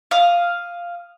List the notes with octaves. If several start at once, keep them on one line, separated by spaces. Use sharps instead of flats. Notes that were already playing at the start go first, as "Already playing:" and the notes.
F5 D#6